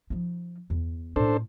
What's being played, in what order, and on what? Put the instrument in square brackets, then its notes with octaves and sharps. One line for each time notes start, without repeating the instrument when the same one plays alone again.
[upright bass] F3 D#4
E2
[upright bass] A2 C#4 [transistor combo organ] D4 A4 C5